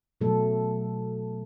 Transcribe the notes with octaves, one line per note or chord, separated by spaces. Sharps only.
B2 F#3 A3 A4